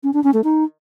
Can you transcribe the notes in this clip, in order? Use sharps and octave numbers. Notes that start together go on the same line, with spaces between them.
C#4
D4
C#4
A3
D#4